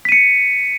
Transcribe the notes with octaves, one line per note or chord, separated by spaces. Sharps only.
B6 C#7 D#7